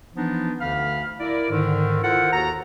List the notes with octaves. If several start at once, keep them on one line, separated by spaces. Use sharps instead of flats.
E3 F3 B3 D4 D#4
D2 D3 F5 B5 F6
E4 A#4 D5
G#2 D3 D#3
E4 F4 A4 A#4 C5 F#5
D#2 F#4 A4 A#5